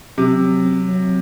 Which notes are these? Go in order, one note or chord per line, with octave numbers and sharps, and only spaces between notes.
C3 F#3
F#3
C4
F#3